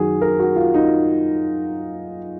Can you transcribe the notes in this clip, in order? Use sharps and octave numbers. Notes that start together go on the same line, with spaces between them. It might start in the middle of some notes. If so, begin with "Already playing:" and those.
Already playing: F#2 D#3 F#4 G#4
A#4
F#4
F4
D#4